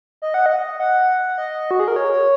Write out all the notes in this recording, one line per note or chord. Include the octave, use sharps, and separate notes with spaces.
D#5
F#5
D#5
F#5
D#5
F#4
G#4
A#4
C#5